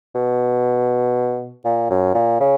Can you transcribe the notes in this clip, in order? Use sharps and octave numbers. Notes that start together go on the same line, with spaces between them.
B2
A#2
F#2
A#2
C#3